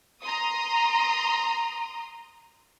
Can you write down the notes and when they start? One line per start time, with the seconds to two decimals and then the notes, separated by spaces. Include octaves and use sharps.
0.22 A#5 C6 D#6